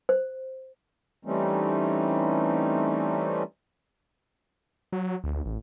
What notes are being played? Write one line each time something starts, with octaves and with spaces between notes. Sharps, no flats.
C5
E3 G3 A3 C4 C#4 D#4
F#3
D2
A1